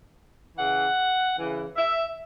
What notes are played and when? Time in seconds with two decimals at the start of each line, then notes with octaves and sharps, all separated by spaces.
0.57 C#3 E3 F#5
1.36 C#3 E3
1.76 E5